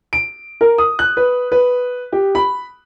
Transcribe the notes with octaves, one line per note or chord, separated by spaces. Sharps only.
D7
A#4
D#6
F#6
B4
B4
G4
B5